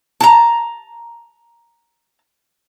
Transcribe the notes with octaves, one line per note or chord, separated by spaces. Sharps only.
A5 A#5